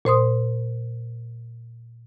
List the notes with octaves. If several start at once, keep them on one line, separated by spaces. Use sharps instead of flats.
A#2 C5 C6 D#6